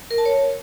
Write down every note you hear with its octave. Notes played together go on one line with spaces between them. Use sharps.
A#4
A5
C#5